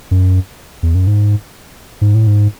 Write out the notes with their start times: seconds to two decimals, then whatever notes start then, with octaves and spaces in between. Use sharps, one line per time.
0.11 F#2
0.83 E2
0.95 F#2
1.07 G#2
2.01 G#2
2.15 A2
2.27 G#2